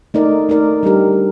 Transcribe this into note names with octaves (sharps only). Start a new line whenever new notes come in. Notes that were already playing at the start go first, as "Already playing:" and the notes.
A3 D#4 A#4 D5
A3 D#4 A#4 D5
G3 D4 G4 A#4